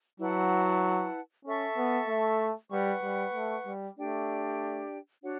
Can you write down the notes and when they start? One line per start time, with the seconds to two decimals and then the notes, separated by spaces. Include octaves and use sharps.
0.20 F#3 E4 B4 F#5 A5
1.45 C#4 A4 E5 A5 C#6
1.77 B3
2.08 A3
2.71 G3 B4 F#5 C#6
3.03 G3
3.34 A3
3.66 G3
3.97 A3 D4 G4 D5 G5
5.23 D4 F#4 C#5 F#5